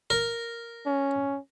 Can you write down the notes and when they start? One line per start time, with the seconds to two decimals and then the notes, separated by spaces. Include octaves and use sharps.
0.10 A#4
0.86 C#4